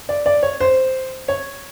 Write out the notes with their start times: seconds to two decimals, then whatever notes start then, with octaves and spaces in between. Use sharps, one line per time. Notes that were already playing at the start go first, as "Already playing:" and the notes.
0.09 D5
0.26 D5
0.43 C#5
0.61 C5
1.28 C#5